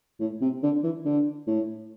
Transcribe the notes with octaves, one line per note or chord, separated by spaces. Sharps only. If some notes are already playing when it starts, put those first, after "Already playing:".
A2
C3
D3
E3
D3
A2